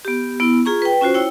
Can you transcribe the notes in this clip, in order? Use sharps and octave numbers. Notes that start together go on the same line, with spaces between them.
B3 G4
B3 E4
F4 G#4 A#5 C#6
B4 G5
C#4 F4 F#4 C5
E4 C#5 G5